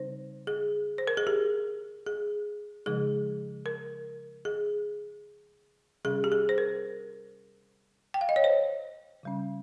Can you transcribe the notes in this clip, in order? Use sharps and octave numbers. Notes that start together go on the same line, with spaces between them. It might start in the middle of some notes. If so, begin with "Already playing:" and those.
Already playing: C#3 G3 C4 D#4 C5
G#4
C5
A#4
G#4
G4
G#4
C#3 F3 G#3 D#4 G#4
A#4
G#4
C3 G3 C#4 G#4
G4
G#4
C5
A#4
G5
F5
D#5
C#5
C5
C#3 G3 C#4